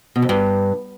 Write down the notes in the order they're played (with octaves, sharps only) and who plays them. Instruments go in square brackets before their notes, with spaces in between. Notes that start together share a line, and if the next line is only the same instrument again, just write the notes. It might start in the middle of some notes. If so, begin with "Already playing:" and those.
[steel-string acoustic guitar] B2
F2
G2